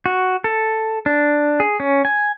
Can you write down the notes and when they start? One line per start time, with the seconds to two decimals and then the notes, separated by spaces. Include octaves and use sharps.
0.06 F#4
0.44 A4
1.06 D4
1.60 G#4
1.80 C#4
2.05 G#5